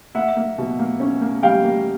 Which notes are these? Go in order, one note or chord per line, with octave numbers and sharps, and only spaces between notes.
A#3 E5 F#5
A#3
B2
A#3
C#4
A#3
G3 F5 G5
A#3